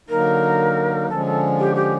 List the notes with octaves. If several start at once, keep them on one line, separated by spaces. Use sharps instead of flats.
D3 F#3 A#3 D#4 A#4
D3 F3 G#3 C#4 A4
A4
G4
G4